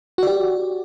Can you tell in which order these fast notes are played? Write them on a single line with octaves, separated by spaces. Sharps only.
F#4 D5 G4